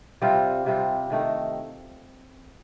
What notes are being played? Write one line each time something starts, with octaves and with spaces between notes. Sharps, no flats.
C3 G3 C4 F4
C3 G3 C4 F4
C3 D#3 A3 D#4